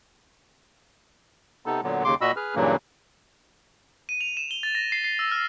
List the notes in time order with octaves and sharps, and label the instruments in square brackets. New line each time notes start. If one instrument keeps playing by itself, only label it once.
[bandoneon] C3 B3 D#4 A4
A#2 D3 F#3 B3
D#2 C#3 C6 D6
A#2 F#4 D#5 B5 E6
G#4 B4 F6
G2 A#2 C#3 E3 F#3 A#3
[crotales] D#7
F7
E7
G7
A6
A#6
C7
C7
E6
F6